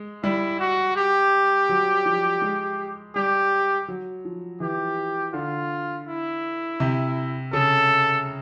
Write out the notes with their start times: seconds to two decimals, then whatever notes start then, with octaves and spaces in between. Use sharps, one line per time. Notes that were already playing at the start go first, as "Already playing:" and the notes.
Already playing: G#3
0.23 G3 E4
0.59 F#4
0.96 G4
1.69 F#3
2.06 F3
2.42 G#3
3.15 G3 G4
3.88 F#3
4.25 F3
4.60 E3 G4
5.33 D3 F4
6.07 E4
6.80 C3
7.53 C#3 A4